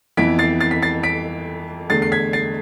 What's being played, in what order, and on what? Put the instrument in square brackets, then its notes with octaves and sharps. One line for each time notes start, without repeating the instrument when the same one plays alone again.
[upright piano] F2 E3 B3 E4 B6 D7
A6 C7
A6 C7
B6
A6 C7
B6 D7
E2 D3 A3 A6 C7
C7
G#6 B6
A6 C7